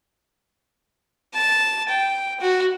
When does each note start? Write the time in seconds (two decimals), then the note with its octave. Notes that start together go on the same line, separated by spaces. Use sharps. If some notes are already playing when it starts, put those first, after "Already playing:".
1.34 A5
1.89 G5
2.40 F#4